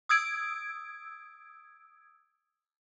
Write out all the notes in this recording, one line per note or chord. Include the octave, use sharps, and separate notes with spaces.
D#6 E6 G#6 D7